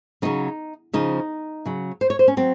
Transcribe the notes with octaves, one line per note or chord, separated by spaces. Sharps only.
C#3 F#3 D#4
C#3 F3 D#4
C#3 F#3
C5
C#5
C5
C#4
F#3 C4